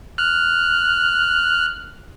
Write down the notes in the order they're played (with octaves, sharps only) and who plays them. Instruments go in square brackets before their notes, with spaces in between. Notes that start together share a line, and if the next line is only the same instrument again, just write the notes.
[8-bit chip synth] F6 F#6